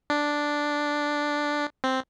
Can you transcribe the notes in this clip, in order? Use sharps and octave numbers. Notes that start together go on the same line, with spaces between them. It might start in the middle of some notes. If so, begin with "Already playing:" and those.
D4
C4